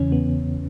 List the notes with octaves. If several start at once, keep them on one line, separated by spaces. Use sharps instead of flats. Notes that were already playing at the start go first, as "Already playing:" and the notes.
Already playing: E2 C#3 E3 C#4
B3